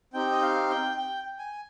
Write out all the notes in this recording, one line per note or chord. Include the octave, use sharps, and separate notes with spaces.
C4 D#4 G4 G5
D#5
F5
G5
G5
G#5